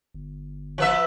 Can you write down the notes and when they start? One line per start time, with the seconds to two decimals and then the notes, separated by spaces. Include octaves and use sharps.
0.14 G1
0.78 F3 B4 E5